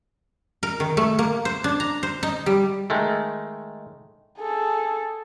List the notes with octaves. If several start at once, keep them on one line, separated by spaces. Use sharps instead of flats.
A#4
D#3
A3
A#3
C5
D4
A#5
C5
D#4
G3
D#3 G#3 A3
G#4 A4